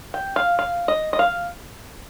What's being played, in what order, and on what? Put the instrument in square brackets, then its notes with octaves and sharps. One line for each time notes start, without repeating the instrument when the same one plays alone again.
[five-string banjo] G5
F5
F5
D#5
D#5
F5